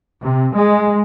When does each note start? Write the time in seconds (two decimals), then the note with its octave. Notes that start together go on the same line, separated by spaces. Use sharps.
0.22 C3
0.55 G#3